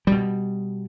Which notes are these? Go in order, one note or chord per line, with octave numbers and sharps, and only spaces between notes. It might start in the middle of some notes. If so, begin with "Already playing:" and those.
B2 G3